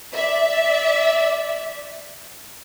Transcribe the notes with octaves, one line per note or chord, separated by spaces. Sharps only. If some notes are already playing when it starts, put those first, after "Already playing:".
D5 E5